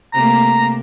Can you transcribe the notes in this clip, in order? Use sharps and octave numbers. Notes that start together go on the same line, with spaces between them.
C3 A3 A#3 A#5